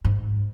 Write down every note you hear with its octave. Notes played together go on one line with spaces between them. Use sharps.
G#2